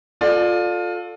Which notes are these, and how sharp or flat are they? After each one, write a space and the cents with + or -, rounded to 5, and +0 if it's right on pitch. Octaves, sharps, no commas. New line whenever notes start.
F4 +20 A4 +0 D5 +25